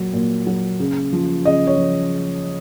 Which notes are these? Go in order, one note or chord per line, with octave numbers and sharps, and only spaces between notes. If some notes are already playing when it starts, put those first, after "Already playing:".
Already playing: A#2 F#3
A#2
F#3
C#3
F3
C#3 D#5
C#5
F3